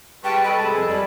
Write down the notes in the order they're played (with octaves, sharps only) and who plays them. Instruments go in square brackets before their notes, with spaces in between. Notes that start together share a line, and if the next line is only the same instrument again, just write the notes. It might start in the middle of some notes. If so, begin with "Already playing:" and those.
[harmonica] G3 G#3 C#6 [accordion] B4 A5 [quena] G5
[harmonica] A4 D#5 [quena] B5
[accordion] C3 G#3 [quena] B5
[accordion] F2 [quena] G#4
[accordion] G3 [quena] B5